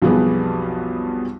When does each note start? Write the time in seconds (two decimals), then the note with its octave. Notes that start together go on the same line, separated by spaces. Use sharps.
0.02 B1 F2 B2 G3 B3 G#4